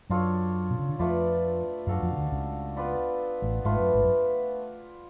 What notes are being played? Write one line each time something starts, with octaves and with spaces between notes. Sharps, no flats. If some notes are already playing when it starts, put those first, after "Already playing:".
F#2 F#3 D4 F4 A4 C#5
B2
C#3
D3
F2 F3 A3 F4 B4 D5
F#2 F#3 D4 F#4 A4 F5
F2 F3
C#3
D2 D3
C#2 C#3
B3 F4 B4 D5
A1 A2
G#1 G#2 A3 F4 B4
F#2
G#1 G#2
F#2